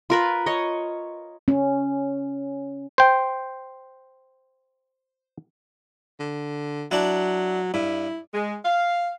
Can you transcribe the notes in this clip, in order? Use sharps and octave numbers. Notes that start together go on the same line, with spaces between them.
F4 A#4 B4
C#5 D#5
C#4
C5 G5
D3
F#3 D4 E4
G2 E4
G#3
F5